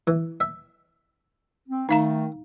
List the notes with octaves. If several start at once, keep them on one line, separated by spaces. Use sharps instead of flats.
E3
E5
C4
D#3 A3 D#4 F5 A#5